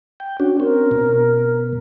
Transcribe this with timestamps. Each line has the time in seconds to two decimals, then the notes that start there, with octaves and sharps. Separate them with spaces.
0.20 G5
0.40 C#4 D4 F#4
0.60 C4 C#4 A#4
0.91 B2